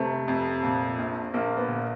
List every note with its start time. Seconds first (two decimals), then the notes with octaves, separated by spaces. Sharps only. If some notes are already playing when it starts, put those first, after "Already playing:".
Already playing: F1 C3 A3
0.28 F2
0.63 A#2
0.98 A#1
1.34 A#1 A#3
1.57 B3
1.68 A#2